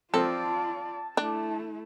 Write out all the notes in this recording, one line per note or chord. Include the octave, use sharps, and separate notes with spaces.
F3 C4 F4 A4 D5 A5
A3 D4 E4